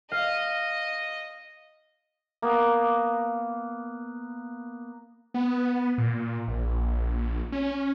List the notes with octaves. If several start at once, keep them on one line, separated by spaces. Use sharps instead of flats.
D#5 F5
A#3 B3
B3
A#2
A#1
C#4